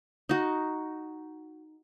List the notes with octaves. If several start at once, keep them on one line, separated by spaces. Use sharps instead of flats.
D#4 F#4